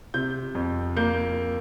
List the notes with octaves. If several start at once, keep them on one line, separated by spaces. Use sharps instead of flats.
C3 G6
F2
A#3 G6